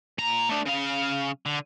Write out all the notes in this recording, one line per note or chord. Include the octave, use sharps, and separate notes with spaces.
A#2 A#5
A3 D4
C#3 F5
D3